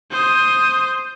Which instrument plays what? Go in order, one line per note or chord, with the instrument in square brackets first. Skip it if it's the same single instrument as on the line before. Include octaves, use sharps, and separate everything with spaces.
[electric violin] C5 D#6